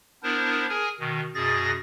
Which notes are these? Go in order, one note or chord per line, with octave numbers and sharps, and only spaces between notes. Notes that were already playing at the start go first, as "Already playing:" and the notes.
B3 D4 E4 A#4 C5
G#4 A#4 G#5
B2 D#3
F#2 B2 G#4 A6 A#6